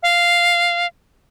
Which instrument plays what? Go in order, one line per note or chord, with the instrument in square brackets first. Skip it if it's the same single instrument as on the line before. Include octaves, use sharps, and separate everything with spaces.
[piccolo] F5